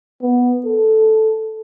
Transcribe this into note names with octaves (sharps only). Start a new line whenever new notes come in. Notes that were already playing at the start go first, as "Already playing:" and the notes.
B3
A4